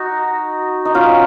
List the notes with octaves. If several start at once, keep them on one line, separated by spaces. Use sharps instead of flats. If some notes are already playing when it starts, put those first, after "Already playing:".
Already playing: D#4 F#4
D#4
C#4 F4